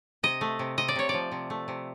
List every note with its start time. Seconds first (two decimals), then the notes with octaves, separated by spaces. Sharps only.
0.23 C3 D#5
0.41 A3
0.59 C3
0.77 C3 D#5
0.88 D5
0.95 C3 C#5
1.09 F3 D5
1.32 C3
1.50 A3
1.68 C3